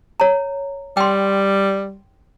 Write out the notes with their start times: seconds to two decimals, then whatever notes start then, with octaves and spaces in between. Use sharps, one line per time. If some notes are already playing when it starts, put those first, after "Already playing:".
0.20 C#5 A#5
0.97 G3 G5 C6